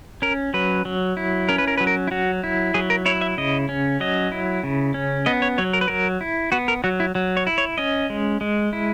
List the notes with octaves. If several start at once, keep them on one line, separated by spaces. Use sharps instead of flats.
C#4 A#4
F#3 B4
F#3
E4
C#4 A#4
B4
A#4
F#3 B4
A#4
E4
F#3 F#4
E4
F#3 G#4
A#4
E4 C#5
E5
C#3 D#5
C#4
F#3 D#5
E4
C#3
C#4
B3 D#5
C#5
F#3 C#5
A#4
B4
F#3 A#4
E4
B3 F#4
A#4
F#3 F#4
E4
F#3
C#5
E4
C#5
C#4 D#5
G#3
G#3
E4